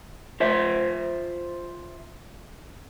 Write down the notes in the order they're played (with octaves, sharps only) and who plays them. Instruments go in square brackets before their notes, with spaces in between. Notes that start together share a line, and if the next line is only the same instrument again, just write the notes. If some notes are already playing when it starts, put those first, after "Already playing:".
[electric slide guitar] F4 C5 E5